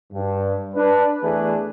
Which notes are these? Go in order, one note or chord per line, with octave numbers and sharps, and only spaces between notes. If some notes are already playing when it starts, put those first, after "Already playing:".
G2
D4 B4
E2 E3 A3 D4 G#4 B4